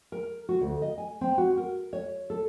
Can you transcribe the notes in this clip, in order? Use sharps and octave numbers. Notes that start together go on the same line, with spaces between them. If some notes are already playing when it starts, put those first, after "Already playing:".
A#4
F#4
D2
D#5
G#5
C4
F#4
A#4
C#5
A4